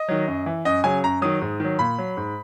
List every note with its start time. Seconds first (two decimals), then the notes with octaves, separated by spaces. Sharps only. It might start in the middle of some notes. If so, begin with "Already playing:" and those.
Already playing: D#5
0.08 D#3 F#3
0.27 F#2
0.46 E3
0.65 F#2 D#5
0.84 C#3 F#3 G#5
1.04 F#2 A#5
1.22 D#3 F#3 D#6
1.41 G#2
1.60 D#3 F#3
1.79 A#2 B5
1.98 F#3
2.17 G#2